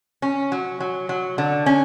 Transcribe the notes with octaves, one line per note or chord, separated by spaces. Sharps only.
C#4
F#3
F#3
F#3
D3
C#4